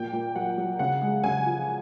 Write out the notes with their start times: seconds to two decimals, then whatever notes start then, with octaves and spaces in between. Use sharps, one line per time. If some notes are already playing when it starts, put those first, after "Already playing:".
Already playing: A#2 F3 G5
0.13 A#2
0.35 F#3 F#5
0.58 F#3
0.79 C#3 F#5
1.02 G#3
1.24 C#3 G#5
1.46 F3